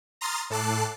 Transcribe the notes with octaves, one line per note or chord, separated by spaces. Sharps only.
A#5 C6 D#6 F6 A6
A2 A4 A5 D6 F#6 C7